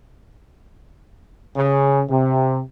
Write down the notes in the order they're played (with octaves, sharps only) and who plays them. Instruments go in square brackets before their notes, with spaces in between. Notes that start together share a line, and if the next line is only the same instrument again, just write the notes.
[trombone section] C#3
C3